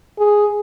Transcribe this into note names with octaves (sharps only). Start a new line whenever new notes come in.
G#4